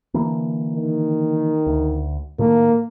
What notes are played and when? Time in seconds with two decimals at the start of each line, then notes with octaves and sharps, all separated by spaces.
0.14 D3 E3 A#3
0.75 D#3
1.67 D2
2.39 A2 D#3 A3 A#3